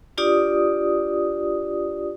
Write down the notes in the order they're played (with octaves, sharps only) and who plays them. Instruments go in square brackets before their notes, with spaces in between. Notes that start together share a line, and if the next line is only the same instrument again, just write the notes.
[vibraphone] D4 F4 G4 D5 D#6